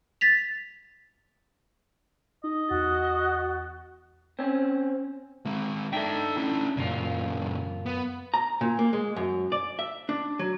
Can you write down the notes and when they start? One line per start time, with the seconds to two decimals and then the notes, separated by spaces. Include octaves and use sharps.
0.21 A6 B6 F7
2.44 D#4 D#5
2.69 E2 F#4 A6
4.39 C4 C#4
5.46 G#3 C4
5.93 D4 D#4 A4 E5 G5
6.37 C#4 E4
6.77 F#2 A#2 C#3 F4
7.86 B3
8.34 A#5
8.61 A#2
8.79 A#3
8.93 G#3
9.16 F#2
9.52 D5
9.79 E5
10.09 D4
10.39 F#3